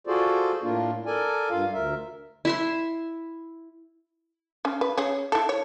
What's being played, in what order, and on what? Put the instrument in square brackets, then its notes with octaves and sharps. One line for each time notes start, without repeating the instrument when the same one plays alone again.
[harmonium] F4 F#4 G#4 A4 C5 D5
A2 A#3 D4 F4
A4 A#4 D5 G#5
G2 F4 F5
D2 A#4 E5
[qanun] E4 E5 C6
[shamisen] C#4
B4
C#4 G#4
E4 A4
C#5